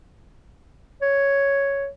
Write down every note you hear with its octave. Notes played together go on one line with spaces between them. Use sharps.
C#5